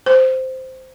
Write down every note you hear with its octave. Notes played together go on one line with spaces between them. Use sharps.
C5